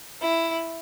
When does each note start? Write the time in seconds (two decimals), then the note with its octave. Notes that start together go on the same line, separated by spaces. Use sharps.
0.21 E4